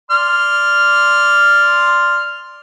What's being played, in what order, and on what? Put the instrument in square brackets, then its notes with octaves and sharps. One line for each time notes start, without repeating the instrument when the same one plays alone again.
[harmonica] D5 C6 F6